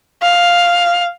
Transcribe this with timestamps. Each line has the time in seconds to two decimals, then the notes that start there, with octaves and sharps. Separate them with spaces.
0.22 F5